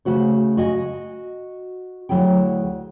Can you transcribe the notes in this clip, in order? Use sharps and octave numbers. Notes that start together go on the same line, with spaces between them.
C#3 A3 F#4 C5
F#4 D#5 G#5
D2 G2 F#3 E4 G#4 G5